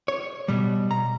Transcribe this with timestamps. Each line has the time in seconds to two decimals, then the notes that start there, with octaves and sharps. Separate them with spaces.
0.08 C#5
0.48 B2 G3
0.91 A#5